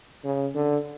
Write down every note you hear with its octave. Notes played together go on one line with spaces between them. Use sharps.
C#3
D3